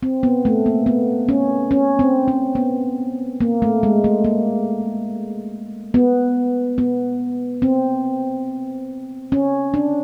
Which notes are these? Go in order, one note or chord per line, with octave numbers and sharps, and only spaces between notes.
C4
B3
A3
A#3
B3
C#4
C#4
C4
C#4
B3
A#3
A3
G#3
A3
A#3
B3
B3
C4
C#4
D4